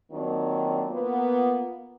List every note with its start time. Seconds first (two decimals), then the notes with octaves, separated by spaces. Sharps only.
0.12 D#3 F#3 A#3 C4 D4 F4
0.91 A#3 B3 F4